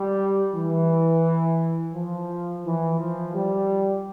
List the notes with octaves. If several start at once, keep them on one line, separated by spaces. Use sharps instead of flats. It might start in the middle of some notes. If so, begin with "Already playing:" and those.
Already playing: G3
E3
F3
E3
F3
G3